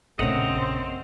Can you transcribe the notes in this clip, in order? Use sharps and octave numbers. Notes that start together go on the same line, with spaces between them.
A#1 F#2 C#3 A3 C4 D#5 F#5 A#5